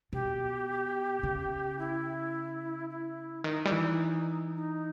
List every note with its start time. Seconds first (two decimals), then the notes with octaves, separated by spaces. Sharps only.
0.12 B2 G4
1.23 C#3
1.78 E4
2.89 E4
3.44 D#3 D#4
3.65 G3
3.72 E3
4.55 D#4